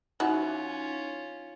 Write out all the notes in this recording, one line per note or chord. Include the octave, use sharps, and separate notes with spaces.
E3 C#4 D#4 F4 F#4